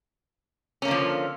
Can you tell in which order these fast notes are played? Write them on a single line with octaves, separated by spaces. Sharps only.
C#4 A#3 D3 F3